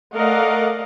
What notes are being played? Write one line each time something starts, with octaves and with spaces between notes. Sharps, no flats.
A3 A#4 D5 D#5 F5 F#5